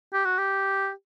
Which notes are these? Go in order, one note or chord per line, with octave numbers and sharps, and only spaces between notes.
G4
F#4
G4